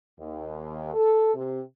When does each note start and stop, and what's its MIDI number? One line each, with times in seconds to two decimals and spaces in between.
0.19 0.91 39
0.94 1.33 69
1.34 1.61 48